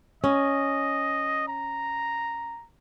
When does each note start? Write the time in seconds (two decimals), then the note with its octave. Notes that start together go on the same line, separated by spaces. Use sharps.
0.24 C#4 D#5
1.48 A#5